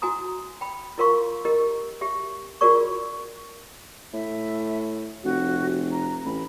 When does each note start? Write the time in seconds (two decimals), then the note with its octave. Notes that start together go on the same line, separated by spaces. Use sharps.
0.02 E4 F#4 G#5 A#5 D#6
0.61 G5 B5
0.98 E4 F4 A#4 F5 C6 C#6
1.45 E4 G4 A#4 D#5
2.01 G4 E5
2.61 F4 F#4 G#4 A#4 D5 C#6
4.13 A2 E5
5.24 F1 F#4
5.92 A#5
6.25 A1 B5